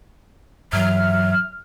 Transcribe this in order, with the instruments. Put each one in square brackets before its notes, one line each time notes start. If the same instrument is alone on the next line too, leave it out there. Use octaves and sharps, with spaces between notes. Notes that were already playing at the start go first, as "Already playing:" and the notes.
[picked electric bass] G2 E3 [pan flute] F#3 [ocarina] E5 [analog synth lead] F6